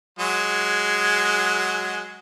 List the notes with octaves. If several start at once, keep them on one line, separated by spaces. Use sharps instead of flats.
F#3 G#3